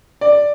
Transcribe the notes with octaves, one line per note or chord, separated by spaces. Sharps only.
D5